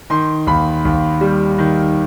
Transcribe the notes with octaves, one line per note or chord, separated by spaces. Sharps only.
D#3 C6
D#2 B5
D#2
G3
D#3